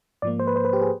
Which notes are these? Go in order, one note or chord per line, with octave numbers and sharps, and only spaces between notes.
G#2 F3 A#3 D5
C5
B4
C5
B4
G4
G#4